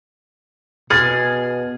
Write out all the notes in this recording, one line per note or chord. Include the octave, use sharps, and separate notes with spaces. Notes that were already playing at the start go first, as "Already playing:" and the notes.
B2 G#4 F6 A6